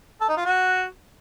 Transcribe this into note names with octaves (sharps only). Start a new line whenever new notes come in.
A4
D#4
F4
F#4